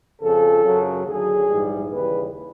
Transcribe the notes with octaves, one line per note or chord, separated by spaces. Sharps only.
F2 C#3 F3 A4
F#2 C#3 F#3
D#2 D3 F#3 G#4
A#1 G#2 E3 G3
D#2 C#3 E3 G3 B4